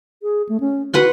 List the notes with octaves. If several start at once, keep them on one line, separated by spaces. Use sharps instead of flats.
G#4
A3
C#4
F#4 B4 F#5 C6